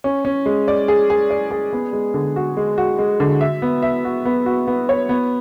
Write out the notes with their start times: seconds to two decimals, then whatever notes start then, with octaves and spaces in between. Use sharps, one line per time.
0.04 C#4
0.25 C#4
0.46 G#3
0.68 D5
0.88 G#4
1.10 G#4
1.30 D5
1.51 G#4
1.73 B3
1.93 G#3
2.14 D3
2.36 F#4
2.57 G#3
2.78 F#4
2.99 G#3
3.20 D3
3.41 E5
3.62 B3
3.82 E5
4.05 F#4
4.25 B3
4.46 F#4
4.67 B3
4.89 C#5
5.09 B3